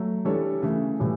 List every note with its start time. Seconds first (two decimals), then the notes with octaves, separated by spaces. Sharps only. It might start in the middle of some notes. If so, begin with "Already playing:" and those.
Already playing: F#3 A3
0.25 E3 G3 D4 A4 C#5
0.62 C#3 E3 A3
0.99 A2 E3 G3 C#4